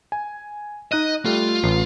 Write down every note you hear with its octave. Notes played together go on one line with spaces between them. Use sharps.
G#5
D#4 D#5 F#6 D#7
G3 A3 F4
A1 C7